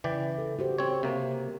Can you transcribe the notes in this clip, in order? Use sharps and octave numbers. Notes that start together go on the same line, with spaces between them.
C#3 E3 D5 G5
A4
F#4 G4 C5
C4 C#5
C3 A#3